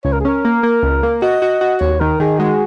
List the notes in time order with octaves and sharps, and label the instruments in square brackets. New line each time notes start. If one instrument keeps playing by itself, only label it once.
[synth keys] C#2 [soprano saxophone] C#5
[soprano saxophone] A#4
G#4
[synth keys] C#4 [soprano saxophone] A#4
[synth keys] A#3
A#3
C#2
A#3
[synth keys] F#4 [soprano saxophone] D#5
[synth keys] F#4
F#4
[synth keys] D#2 [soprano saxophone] C#5
[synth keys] D#3 [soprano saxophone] A#4
[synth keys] D#3 [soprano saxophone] G#4
[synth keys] G#3 [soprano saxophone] F#4